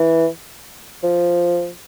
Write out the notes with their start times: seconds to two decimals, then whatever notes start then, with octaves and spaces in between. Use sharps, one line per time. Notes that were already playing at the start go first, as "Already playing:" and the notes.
Already playing: E3
1.03 F3